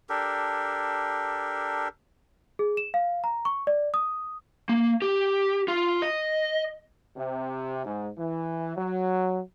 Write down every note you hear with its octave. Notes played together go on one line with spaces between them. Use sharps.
D4 G4 A4 A#4
G#4
E7
F5
A#5
C#6
D5
D#6
A#3
G4
F4
D#5
C3
G#2
E3
F#3